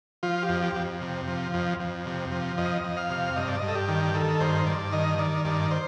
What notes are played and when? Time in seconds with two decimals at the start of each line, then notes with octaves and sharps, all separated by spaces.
0.23 F3 F4
0.43 G4
0.49 F2
0.62 G4
0.75 F2
1.01 C3
1.27 F3
1.54 F2
1.80 F2
2.06 C3
2.31 F3
2.58 F2 D#5
2.84 F2
2.97 F5
3.10 C3
3.36 G2 D#5
3.48 D5
3.59 G2 D#5
3.68 A4
3.75 G4
3.88 D#3
4.14 D#3 A4
4.40 G2 C5
4.66 G2 D5
4.92 D#3 D#5
5.18 D#3 D5
5.45 G2 D5
5.71 C5